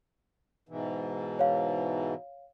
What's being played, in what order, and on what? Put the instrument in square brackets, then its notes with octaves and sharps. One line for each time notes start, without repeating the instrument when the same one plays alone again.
[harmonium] G#2 B2 E3
[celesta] C#5 F5